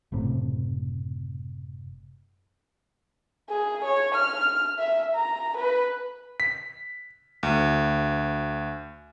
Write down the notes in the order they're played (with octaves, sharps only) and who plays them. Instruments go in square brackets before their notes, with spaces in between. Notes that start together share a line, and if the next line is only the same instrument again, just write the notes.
[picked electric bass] F#1 A2 C3
[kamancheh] G#4
C#5
F6
E5
A#5
B4
[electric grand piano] B6
D2